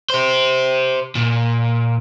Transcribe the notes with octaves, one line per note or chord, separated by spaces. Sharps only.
G4 C5
A#2